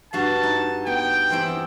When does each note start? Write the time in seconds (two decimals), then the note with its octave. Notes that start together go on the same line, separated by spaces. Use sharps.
0.13 G2 F#4 F5 A5
0.43 D#4
0.87 B3 G5
1.30 E2 C4 E4